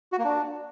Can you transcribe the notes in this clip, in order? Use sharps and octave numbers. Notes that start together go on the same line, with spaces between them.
F#4
A#3
D4